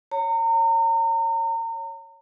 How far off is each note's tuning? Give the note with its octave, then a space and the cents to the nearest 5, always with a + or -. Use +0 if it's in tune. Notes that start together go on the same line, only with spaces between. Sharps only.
C#5 +0 A#5 -35